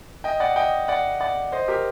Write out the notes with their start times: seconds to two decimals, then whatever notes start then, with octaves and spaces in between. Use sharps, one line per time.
0.24 D#5 G5
0.40 D5 F#5
0.56 D#5 G5
0.88 D5 F#5
1.20 D5 F#5
1.52 C5 D#5
1.68 G4 A#4